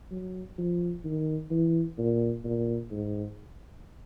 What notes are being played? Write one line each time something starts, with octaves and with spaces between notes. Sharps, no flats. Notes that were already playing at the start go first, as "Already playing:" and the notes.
F#3
F3
D#3
E3
A#2
A#2
G#2